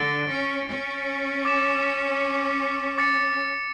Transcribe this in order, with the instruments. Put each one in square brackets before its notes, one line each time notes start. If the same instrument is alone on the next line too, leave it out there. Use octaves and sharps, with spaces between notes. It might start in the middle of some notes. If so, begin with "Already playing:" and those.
Already playing: [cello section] D3 [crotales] A6 D7 G7
[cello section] C#4
C#4
[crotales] D6 A6 E7
D6 A6 C#7